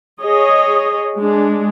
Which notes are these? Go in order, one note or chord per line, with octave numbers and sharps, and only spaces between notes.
G#4 C#5 D#5
G#3 D4